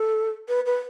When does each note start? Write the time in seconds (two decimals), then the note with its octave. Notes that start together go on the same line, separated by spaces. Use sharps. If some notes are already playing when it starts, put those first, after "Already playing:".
Already playing: A4
0.49 B4
0.66 B4